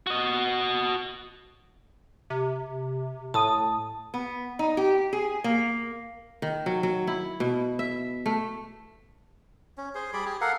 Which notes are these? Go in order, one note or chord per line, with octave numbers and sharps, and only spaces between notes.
F#4 D#5
C3
A2 A5 D#6
B3
D#4
G4
G#4
A#3
D#3
F#3
F#3
E4
B2
E5
A3
C#4
G#4 C5
G3 G#4 D5 B5
G4 G#4
A4 A#4 F5 F#5